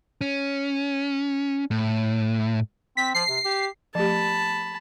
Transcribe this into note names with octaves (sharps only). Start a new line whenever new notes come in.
C#4
A2
C4 B6
F3 C7
C3
G4
F3 A3 G4 A5 B5